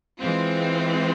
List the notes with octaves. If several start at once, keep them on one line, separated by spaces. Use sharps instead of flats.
E3 G#3 C4 F4